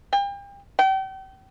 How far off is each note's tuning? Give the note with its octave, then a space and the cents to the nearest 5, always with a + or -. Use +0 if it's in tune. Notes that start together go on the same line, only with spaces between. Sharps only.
G5 +35
G5 -35